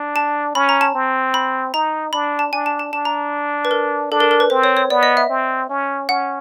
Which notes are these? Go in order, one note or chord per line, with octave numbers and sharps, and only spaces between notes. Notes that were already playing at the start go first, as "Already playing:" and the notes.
Already playing: D4
A5
C#4 B5
A#5
A5
C4
B5
D#4 A#5
D4 B5
A5
D4 G#5
A5
A5
D4 A5
A#5
B4
A#4
D4 A4
A#4
A#4
B4
C4 C5
C#5
C#5
B3 D5
D#5
E5
C4
C#4
C#4 F#5